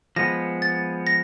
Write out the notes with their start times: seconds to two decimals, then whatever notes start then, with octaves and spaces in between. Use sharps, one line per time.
0.16 F3 G#3 B3 A#6
0.62 A6
1.07 A#6